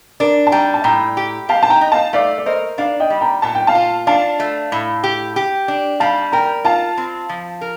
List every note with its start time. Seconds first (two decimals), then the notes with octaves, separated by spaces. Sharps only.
0.20 D4 A#4 D5
0.47 A5
0.52 G3 G5 A#5
0.74 A5
0.84 A2 G5 A#5
1.17 G4
1.49 G4 F5 A5
1.63 A5
1.70 G5 A#5
1.81 D#4
1.92 F5 A5
2.13 A3 D5 F5
2.38 D5
2.46 A#4 C5 D#5
2.78 D4 D5 F5
3.00 D#5 G5
3.10 G3
3.21 G5 A#5
3.42 A#2 A5
3.55 G5
3.67 F5 A5
3.75 F4
4.07 D4 F5 A5
4.40 A3
4.72 A2
5.04 G4
5.36 G4
5.68 D4
6.00 G3 F5 A5
6.32 A#4 G5 A#5
6.64 F4 F5 A5
6.97 C4
7.29 F3
7.61 A#4